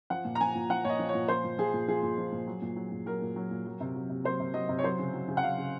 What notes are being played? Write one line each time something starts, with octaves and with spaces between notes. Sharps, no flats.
F3 F#5
A#2
A#5
F3 G#5
A#2
F3 F#5
A#2 C#5 D#5
F3
C#5
A#2
F3 C5
A#2
F3 G#4
A#2
F3 G#4
A#2
F3
A#2
F#3
A#2
F#3
A#2
F#3 A#4
A#2
F#3
A#2
F#3
C3
F#3
C3
F#3 C5
C3
F#3 D#5
C3
C#5
F#3 C5
C#3
F#3
C#3
F#5
F#3 F5
C#3